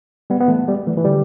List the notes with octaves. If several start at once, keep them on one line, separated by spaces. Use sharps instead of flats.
G3 B3
B3
E3 A3
G3 B3
E3 A3
E3
D3 G3